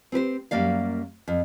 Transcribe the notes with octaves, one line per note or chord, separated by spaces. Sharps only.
C4 G4 B4 C5
F#2 G3 A#3 D5 F5
F2